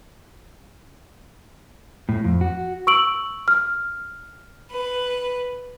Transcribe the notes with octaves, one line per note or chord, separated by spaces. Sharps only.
A2
F2
F#4
C#6 E6 D7 F#7
F6
B4